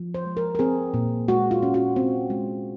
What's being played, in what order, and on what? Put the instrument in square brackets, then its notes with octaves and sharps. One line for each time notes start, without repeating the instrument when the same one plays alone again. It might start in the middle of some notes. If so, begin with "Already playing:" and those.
Already playing: [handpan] F3
C5
G#3
A#4
A#4
C4 G#4
A#2
G#3 F#4
F4
C#4
F#4
C4
G#3